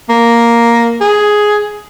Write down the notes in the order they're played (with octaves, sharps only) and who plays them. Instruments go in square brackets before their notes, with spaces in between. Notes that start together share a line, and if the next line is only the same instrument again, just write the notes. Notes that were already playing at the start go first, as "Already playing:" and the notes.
[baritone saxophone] A#3
G#4